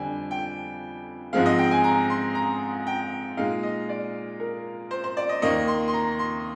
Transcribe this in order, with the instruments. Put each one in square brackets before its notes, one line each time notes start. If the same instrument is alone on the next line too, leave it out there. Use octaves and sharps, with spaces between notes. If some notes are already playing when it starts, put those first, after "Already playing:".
Already playing: [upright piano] F2 D3 G3 D4 G5 G#5
G5
G#2 F3 G#3 C4 F5
D#5
G5
G#5
A#5
C6
A#5
G5
A#2 G#3 D#4 F5
D#5
D5
A#4
C5
C5
D5
D#5
D#2 D#3 A#3 D#5
C6
C6
A#5
C6